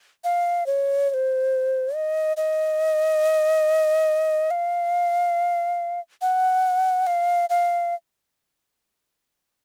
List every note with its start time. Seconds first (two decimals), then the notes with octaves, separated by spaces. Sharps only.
0.24 F5
0.66 C#5
1.09 C#5
1.14 C5
1.95 D#5
2.37 D#5
4.51 F5
6.22 F#5
7.07 F5
7.50 F5